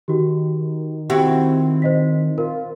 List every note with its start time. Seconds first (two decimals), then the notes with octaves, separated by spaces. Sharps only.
0.08 D#3 F#4 G4
1.10 C4 E4 F#4 G4
1.82 C5 D#5 B6
2.38 F4 A#4